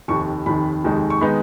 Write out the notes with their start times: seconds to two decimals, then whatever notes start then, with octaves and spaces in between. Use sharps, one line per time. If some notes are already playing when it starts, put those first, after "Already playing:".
0.08 F1 D#2 D#3 C#6
0.46 F1 D#2 D#3 B5
0.84 F1 D#2 D#3 G#3 D#4
1.10 C#6
1.21 D#3 G#3 B3 D#4 B5